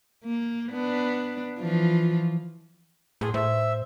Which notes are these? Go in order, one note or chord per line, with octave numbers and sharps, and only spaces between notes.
A#3
B3 D4
E3 F3 F4
A2 G#4 C6 E6
A2 C5 E5